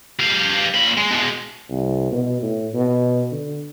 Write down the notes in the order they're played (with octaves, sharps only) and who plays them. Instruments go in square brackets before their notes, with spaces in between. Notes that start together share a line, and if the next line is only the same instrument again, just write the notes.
[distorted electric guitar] G3 F5
A#2 B5
G#3
B2 G#3
[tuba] C2
B2
A2
B2
D3